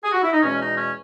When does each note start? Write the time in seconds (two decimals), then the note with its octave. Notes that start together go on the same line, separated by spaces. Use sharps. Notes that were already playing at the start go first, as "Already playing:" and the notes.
0.03 G#4
0.12 F#4
0.22 E4
0.32 D#4
0.42 E2 B2 G#3 C#4
0.60 D#4
0.77 C#4